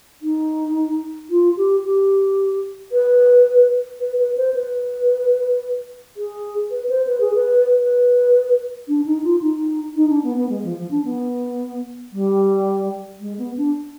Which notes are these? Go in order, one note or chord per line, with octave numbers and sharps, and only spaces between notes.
D#4
F4
G4
G4
B4
B4
B4
C5
B4
G#4
B4
C5
B4
G#4
B4
B4
D4
D#4
F4
D#4
D#4
D4
B3
B3
G#3
F3
F3
D4
B3
G3
G#3
B3
D4